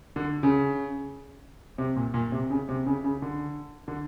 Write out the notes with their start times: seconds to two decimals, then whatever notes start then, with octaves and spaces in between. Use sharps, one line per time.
0.16 D3
0.43 C#3
1.78 C3
1.96 A#2
2.14 A#2
2.32 C3
2.50 C#3
2.69 C3
2.86 C#3
3.04 C#3
3.22 D3
3.88 D3